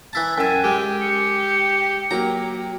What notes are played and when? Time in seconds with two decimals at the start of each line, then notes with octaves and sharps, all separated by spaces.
0.13 E3 E4 A5 A6
0.38 F#2 G5 G#5 E6
0.64 G#3 G4
1.01 C#7
2.11 F#3 A#3 G4 A#5